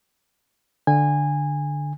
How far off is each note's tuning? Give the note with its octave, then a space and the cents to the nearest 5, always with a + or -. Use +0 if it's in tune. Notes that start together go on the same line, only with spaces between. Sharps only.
D3 +0 G#5 -20